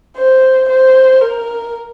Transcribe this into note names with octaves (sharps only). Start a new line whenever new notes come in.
C5
C5
A#4